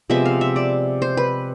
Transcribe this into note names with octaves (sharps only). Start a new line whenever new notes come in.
C3 F3 G#3 B3 E5
F5
E5
D5
C5
B4